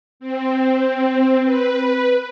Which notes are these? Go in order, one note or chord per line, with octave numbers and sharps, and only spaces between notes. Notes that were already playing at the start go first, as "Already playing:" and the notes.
C4
B4